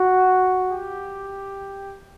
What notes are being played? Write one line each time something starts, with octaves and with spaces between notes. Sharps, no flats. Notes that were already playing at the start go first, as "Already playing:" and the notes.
Already playing: F#4
G4